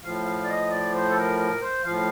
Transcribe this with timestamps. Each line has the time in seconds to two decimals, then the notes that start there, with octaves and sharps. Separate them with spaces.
0.03 A2 F3 F5
0.25 F5
0.44 D5
0.48 D#5
0.71 D5
0.94 C5
1.10 A4
1.17 A#4
1.38 A#4
1.61 C5
1.84 A2 F3 F5